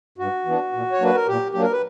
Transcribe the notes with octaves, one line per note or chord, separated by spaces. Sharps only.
G2 F#4
E3 B3 D4
A#2
C#5
F#3 A#3 D4 B4
A#4
A#2 G4
F#3 A#3 D4 G4
A#4
B4